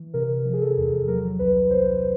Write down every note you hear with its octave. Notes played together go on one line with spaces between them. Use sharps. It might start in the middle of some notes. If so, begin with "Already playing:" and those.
Already playing: E3
C3 A#4
F3
G#4
A4
E2
F#3 A#4
C2 B4
C2 C5